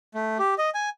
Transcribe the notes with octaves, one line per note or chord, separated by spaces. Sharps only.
A3
G4
D#5
G#5